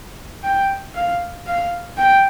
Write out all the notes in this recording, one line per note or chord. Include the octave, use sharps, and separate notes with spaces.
G5
F5
F5
G5